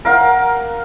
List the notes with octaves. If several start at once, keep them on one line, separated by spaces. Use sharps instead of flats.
A#4 F5 F#5